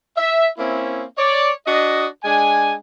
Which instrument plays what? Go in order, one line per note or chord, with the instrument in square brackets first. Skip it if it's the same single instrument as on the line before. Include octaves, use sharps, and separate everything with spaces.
[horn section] E5
A#3 C4 C#4 E4
C#5 D5
D4 F#4 D#5
G#3 D4 G#5